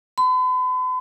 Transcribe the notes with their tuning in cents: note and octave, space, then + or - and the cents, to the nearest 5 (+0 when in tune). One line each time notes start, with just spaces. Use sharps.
B5 +45